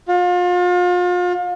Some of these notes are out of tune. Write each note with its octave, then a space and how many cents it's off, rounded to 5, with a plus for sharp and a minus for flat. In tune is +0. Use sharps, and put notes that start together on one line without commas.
F4 +35